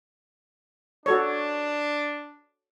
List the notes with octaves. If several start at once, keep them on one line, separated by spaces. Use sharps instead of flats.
D4 F#4 A4 C#5